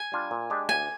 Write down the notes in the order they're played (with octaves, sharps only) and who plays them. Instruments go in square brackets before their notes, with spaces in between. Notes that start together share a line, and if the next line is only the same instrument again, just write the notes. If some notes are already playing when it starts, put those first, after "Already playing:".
Already playing: [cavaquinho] G#5
[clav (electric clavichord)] G3 D4 F4
A#2
G#3 D4 G4
[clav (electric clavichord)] D2 [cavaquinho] G#5